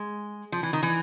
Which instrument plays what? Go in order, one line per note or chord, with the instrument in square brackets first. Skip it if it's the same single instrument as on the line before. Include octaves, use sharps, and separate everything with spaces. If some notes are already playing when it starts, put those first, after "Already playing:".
Already playing: [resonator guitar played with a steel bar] G#3
F3
E3
D#3
E3